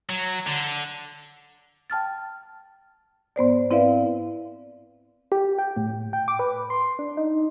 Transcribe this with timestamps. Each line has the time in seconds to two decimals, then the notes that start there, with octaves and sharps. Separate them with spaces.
0.10 F#3
0.47 D3
1.90 G5 A5 F6 A6
3.36 G#2 B3 C5 D5
3.71 C4 E4 B4 D5 E5 F5
5.32 G4
5.59 G5
5.77 A2
6.13 G5
6.28 D6
6.39 B4
6.70 C6
6.99 D4
7.17 D#4